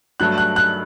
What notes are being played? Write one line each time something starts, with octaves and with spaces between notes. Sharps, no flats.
G2 F#3 A3 F#6
F#6
F#6